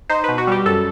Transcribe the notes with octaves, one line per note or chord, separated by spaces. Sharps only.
D#4 C5
B2 B4
F#4
G3 G4
F#2 A4